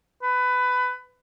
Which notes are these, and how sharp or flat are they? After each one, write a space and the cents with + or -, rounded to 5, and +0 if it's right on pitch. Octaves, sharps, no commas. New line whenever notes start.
B4 +20